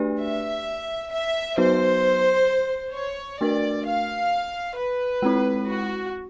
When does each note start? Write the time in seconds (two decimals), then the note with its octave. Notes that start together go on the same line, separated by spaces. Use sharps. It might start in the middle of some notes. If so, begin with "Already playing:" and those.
Already playing: A3 D4 G4 B4 D5
0.20 E5
1.12 E5
1.58 F#3 B3 D#4 F#4 B4 C5
2.94 C#5
3.41 A3 D4 F#4 A#4 D5
3.86 F5
4.77 B4
5.22 G#3 C4 E4
5.68 F#4